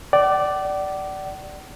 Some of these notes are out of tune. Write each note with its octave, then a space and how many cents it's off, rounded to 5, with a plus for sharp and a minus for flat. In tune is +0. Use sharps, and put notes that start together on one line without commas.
D5 +0 F#5 +45